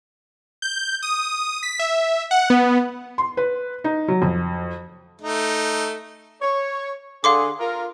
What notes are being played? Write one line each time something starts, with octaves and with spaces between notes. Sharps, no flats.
G6
D#6
B6
E5
F#5
B3
C6
B4
D#4
F#3
F2
A3 D#4
C#5
D3 G#4 F5 C6 D6
F4 A#4